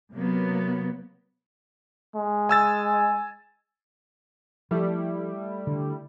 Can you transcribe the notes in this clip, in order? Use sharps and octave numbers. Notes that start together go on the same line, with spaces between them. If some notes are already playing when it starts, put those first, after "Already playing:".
C3 F#3 A#3 B3
G#3
G#5 E6 A6
F3 G3 A3 E4
D3